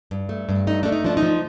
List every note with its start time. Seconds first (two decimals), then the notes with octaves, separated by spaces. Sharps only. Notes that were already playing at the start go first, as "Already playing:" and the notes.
0.11 G2
0.29 A3
0.49 G2
0.67 A3 D#4
0.83 A3 D4
0.92 D#4
1.04 F3 D4
1.17 D#4
1.23 F3